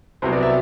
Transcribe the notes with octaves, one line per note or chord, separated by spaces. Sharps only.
C2 C3 F#3 B3 C5
D5
E5